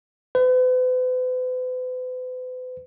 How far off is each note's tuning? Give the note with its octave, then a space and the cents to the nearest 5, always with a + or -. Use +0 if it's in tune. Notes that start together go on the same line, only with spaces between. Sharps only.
B4 +40